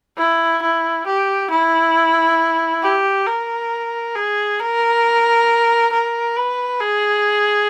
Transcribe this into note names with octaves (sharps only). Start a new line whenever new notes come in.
E4
E4
G4
E4
G4
A#4
G#4
A#4
A#4
B4
G#4